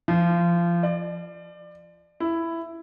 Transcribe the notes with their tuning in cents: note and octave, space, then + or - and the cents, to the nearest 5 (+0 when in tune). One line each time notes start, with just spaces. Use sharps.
F3 -25
D5 +25
E4 +10